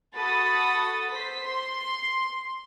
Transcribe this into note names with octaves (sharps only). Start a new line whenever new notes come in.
F#4 A4 B5 D#6 A6
C5 B6
C6